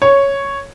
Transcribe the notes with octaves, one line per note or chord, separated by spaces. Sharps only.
C#5